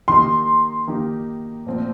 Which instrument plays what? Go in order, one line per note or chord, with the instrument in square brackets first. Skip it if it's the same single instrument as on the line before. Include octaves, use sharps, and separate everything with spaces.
[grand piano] D#3 A#3 D#4 G4 [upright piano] C6
[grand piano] D#3 A#3 D#4 G4
A#2 F3 A3 C4 F4